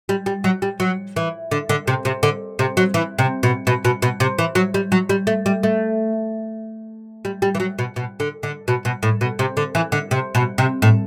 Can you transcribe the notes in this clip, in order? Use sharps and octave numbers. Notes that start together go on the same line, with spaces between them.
G3
G3
F#3
G3
F#3
E3
D3
D3
C3
C3
D3
C3
F#3
E3
C3
B2
B2
B2
B2
C3
E3
F#3
G3
F#3
G3
A3
G3
A3
G3
G3
E3
F#3
B2
B2
D3
D3
B2
B2
A2
B2
C3
D3
E3
D3
C3
B2
C3
A2